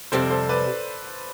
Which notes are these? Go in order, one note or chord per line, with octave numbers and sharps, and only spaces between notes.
F2 C3 G3 A4 C5
A4 C5
B4 D5